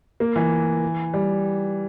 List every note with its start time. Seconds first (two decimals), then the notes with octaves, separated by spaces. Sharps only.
0.20 A#3
0.36 E3
1.14 G3